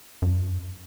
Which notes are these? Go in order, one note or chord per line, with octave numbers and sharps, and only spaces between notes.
F#2